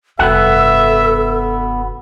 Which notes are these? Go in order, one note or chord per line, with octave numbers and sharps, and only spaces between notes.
F1 G2 B3 F#4 A4 E5 F#5